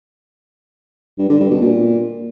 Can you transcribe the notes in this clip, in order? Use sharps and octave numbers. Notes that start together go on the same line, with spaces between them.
G2
D3
G2
B2
A#2